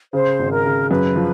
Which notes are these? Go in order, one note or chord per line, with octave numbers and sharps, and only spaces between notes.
C#3 C5
G#1
A#4
C#3
F#2 B4
F3